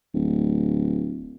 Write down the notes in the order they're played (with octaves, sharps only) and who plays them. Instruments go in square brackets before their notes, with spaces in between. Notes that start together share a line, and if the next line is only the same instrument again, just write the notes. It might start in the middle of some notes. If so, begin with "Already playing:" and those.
[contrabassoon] D1